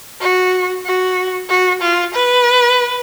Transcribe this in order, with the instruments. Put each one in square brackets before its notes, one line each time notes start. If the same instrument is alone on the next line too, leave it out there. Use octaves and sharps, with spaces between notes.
[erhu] F#4
F#4
F#4
F4
B4